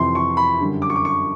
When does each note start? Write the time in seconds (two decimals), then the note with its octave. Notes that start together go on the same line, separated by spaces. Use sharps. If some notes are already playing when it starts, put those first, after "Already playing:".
Already playing: F2 C3 E3 C6
0.15 C#6
0.37 B5
0.60 F#2 D3 G3
0.82 D6
0.90 C#6
0.96 D6
1.05 C#6